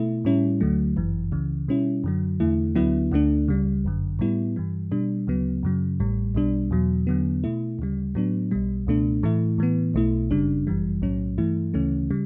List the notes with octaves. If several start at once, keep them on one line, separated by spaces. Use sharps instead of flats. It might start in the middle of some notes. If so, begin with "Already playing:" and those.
Already playing: B2 A3 E4
A2 G3 C#4 E4
D2 D3 F#3 A3
G1 F#2 E3
C#2 C#3 E3
B2 G3 C#4 E4
F#2 D3 F#3
E2 D3 A3 E4
D2 D3 F#3 B3 E4
D2 D3 A3 D4
C#2 C#3 G3
G1 F#2 D3
A2 G3 B3 E4
G2 E3 G3
B2 G3 D4
D2 C#3 F#3 B3
F#2 C#3 F#3
A1 A2 G3
B1 B2 G3 D4
E2 B2 F#3
E2 D3 F#3 B3
B2 A3 E4
D2 C#3 G3
A2 F#3 B3 D4
B1 B2 G3
C#2 B2 A3 D4
A2 E3 A3 E4
A2 E3 B3
B1 B2 A3 E4
G1 F#2 C#3 G3 D4
G1 F#2 E3 G3
B1 A2 F#3 C#4
G2 E3 A3 E4
D2 C#3 E3 A3 C#4
C#3 G3